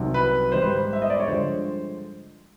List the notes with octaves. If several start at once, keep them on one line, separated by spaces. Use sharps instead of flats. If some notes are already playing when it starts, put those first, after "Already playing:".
Already playing: C2 C3 D#3 F#3
B4
G#2 D#3 G3 C5
B4
C5
E5
D#5
D5
C#5
G2 D3 F3 G#3 C5